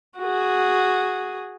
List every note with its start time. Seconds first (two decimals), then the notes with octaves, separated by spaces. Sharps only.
0.18 F#4 G#4